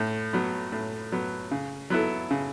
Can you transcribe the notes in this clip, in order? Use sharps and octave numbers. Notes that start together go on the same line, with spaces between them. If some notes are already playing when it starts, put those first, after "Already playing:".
Already playing: A2
F#3 B3
A2
F#3 B3
C#3
F#3 B3 E4 A4
C#3